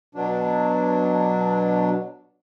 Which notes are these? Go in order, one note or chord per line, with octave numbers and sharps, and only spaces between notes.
B2 F#3 D4